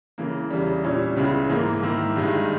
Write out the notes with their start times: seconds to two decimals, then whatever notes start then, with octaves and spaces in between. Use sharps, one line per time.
0.18 C#3 E3 A#3
0.50 E2 C#3 E3 G3
0.84 A#2 G3 C#4 E4
1.16 C#2 C#3 G#3 B3 E4
1.49 G#2 E3 A#3
1.83 G#2 D#3 A#3 E4
2.16 G2 D#3 G#3 D#4